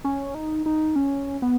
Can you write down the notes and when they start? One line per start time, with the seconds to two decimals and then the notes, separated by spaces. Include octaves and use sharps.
0.04 C#4
0.35 D#4
0.66 D#4
0.96 C#4
1.42 B3